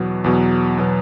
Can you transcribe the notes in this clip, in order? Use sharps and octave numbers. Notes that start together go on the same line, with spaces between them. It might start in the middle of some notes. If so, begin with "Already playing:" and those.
Already playing: E2 B2 F#3 B3
E2 B2 F#3 B3
B2 F#3 B3